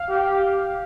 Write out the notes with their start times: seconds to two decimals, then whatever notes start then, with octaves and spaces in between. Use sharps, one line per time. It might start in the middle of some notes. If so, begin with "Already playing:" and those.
Already playing: F5
0.09 G4